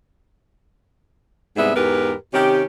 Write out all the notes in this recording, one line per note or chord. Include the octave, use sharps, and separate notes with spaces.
G#2 C3 G3 B3 G#4 E5
E2 G#2 G4 A#4 B4
C3 D#3 C#4 G4